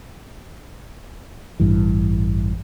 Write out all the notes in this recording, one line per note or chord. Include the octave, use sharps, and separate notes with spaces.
A1 G2 E3